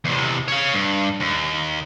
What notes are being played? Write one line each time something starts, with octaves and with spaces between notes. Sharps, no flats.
E2 C3
C#5 F5
G2
D#2